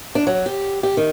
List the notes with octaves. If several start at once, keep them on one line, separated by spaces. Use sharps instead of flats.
D4
F#3
G4
G4
D#3